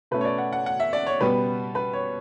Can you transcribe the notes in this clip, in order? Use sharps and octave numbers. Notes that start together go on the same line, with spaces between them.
B2 A3 C#4 B4
C#5
D5
F#5
F#5
F#5
E5
D5
C#5
B2 G3 B3 B4
B4
C#5